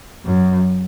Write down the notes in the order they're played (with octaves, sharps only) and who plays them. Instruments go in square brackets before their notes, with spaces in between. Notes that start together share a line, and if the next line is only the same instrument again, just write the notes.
[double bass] F#2